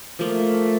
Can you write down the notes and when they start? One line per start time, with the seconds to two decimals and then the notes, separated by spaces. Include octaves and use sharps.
0.19 F3 A3 A#3 F4